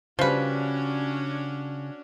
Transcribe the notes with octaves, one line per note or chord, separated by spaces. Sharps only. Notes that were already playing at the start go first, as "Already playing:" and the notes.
C#3 F3 G3 C#4 D4 F#4 B4